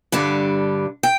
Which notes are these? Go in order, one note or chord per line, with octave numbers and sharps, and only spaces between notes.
G2 D3 G3 A5
G5